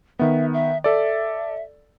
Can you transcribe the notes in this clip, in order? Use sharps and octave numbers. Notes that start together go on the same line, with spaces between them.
D#3 B3 E5
E5
A4 D5 E5